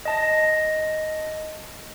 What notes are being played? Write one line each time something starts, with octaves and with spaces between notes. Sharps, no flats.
D#5 A5 A#6